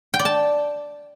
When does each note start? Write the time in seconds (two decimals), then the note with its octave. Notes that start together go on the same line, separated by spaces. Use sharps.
0.14 G5
0.19 D5
0.25 A5